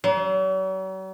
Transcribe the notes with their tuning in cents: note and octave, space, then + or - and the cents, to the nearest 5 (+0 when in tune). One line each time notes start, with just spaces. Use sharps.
F#3 +45